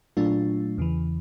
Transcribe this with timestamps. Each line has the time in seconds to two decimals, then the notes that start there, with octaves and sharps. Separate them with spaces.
0.17 A#2 F#3 A3 D4 F4
0.78 E2 C#3 E3